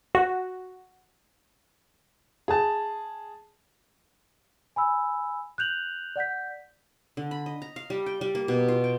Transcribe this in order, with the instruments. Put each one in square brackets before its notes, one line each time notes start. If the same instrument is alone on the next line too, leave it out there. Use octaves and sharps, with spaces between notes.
[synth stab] F#4
[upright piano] G#4 A5
[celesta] G#5 B5 E6
F#6 G6 F7 F#7
D5 F#5 G6 B6
[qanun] D3
B5
D#5
A#5
F5
G3
G5
G3
A#3
B2
F4
G5